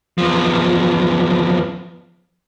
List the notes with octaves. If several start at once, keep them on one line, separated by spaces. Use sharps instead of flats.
E2 F3